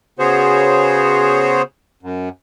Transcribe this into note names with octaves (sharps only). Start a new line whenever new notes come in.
C#3 B3 F#4 G#4 C5 C#5
F#2